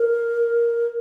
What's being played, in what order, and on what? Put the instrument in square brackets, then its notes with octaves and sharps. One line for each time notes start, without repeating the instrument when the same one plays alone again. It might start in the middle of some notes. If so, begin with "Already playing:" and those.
Already playing: [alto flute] A#4